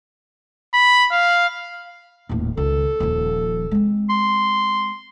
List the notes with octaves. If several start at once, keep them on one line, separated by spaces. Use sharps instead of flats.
B5
F5
D#1 A2
C#2 D#3 A4
D#1 F3
G#3 C4
C6